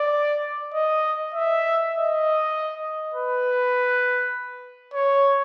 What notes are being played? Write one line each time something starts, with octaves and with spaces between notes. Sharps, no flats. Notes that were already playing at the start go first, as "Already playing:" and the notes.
Already playing: D5
D#5
E5
D#5
B4
C#5